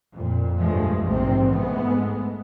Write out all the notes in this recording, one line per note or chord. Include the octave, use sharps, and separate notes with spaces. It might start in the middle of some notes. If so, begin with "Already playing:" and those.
F2 A#2
B1 G2 F3 G#3 A3
A#1 G#2 C3 D#3 C4
G#2 G#3 A3 B3